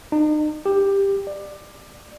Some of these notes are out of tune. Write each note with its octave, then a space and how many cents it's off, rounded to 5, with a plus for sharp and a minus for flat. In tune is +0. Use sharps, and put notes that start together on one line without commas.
D#4 -40
G4 +10
D5 +20